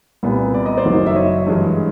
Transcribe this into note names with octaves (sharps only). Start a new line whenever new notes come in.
C2 A#2 G3 B3
D5
D#5
C5 D5
F#1 F#2 D#3 F#3
E5
C#5 D#5
G2 E3 G#3